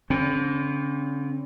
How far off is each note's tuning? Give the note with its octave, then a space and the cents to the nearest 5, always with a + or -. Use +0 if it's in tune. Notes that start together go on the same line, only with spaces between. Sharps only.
D3 -40 C4 +30